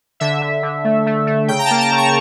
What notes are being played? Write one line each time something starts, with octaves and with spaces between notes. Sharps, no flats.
D3 E5
D3
D3
A3
A3
A3
C#3 G5
A#5
A5
A#3
A#5
C#3
C#6